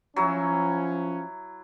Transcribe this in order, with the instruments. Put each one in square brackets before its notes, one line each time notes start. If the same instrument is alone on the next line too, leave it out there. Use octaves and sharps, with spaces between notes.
[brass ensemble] F3 C#4 [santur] F#3 E4